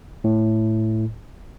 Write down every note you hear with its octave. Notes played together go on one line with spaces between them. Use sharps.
A2